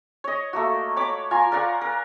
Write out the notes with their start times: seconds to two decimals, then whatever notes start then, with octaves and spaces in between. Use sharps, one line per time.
0.24 C#5 D#5
0.53 A3 A#3 F#4
0.96 C#5 B5 D6
1.31 F4 G#5 A#5
1.52 A#4 D5 F5 F#5
1.81 A#4